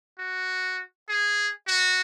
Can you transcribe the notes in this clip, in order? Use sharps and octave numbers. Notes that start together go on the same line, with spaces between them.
F#4
G#4
F#4